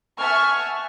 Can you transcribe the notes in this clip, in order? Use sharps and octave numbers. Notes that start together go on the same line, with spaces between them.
E5 F#5 G#5 A5 C#6 F6